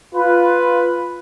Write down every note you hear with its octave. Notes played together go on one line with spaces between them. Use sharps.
F4 B4